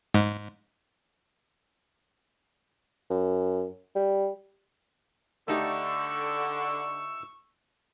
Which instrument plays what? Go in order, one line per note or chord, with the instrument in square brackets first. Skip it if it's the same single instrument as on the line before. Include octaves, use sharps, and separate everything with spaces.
[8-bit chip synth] G#2
[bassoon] F#2
G3
[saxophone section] D3 [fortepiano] A3 D#4 G4 [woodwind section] C#6 [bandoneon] E6